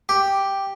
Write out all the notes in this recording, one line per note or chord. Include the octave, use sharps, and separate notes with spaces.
G4